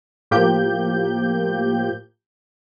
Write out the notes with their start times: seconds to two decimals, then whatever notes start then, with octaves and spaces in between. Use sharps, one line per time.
0.31 A2 F3 A#3 G4 G6